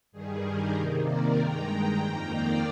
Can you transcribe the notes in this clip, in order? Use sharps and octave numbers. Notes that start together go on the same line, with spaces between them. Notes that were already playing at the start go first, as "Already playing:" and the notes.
G2 D#3 G3 G#4
G4 A#4
C3 D#3 A#3
A#4 D5
G2 D#3 G#3 G5 A#5
F2 D#3 A#3
D5 F5